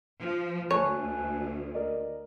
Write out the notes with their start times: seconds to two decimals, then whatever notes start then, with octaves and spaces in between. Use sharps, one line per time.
0.20 F3
0.71 D2 C#5 G#5 A5 F#6
1.74 A#4 D5 D#5